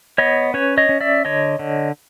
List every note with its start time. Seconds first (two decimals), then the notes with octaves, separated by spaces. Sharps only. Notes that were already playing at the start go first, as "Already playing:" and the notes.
0.18 B3 C#5 D#5
0.54 C#4 B4 C#5
0.77 C#5 D#5
0.89 C#4
1.01 D5 E5
1.25 D3 C#5 D#5
1.59 D3